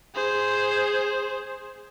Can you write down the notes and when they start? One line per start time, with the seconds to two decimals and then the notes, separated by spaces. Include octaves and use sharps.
0.15 G#4 C5